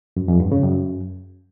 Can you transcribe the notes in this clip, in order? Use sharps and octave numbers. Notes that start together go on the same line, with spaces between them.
F#2
F2
G2
C#3
F#2